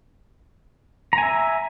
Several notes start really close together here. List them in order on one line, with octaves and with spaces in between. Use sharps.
A#5 G#5 E5